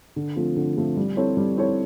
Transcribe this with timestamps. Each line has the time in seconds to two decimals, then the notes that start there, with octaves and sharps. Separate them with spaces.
0.16 D3
0.36 F3 A3 C4
0.56 D3
0.77 F3 A3 C4
0.97 G3
1.17 C4 E4 A4 C#5
1.37 G3
1.57 C4 E4 A4 C#5